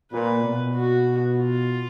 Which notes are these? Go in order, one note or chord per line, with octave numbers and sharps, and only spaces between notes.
A#2 B4
B2
F#4
F4